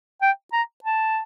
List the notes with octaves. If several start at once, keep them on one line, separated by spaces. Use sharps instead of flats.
G5
A#5
A5